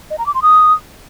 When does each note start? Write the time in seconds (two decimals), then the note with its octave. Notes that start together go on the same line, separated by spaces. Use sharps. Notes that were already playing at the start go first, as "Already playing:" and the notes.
0.10 D#5
0.18 A#5
0.26 D6
0.34 C6
0.42 D#6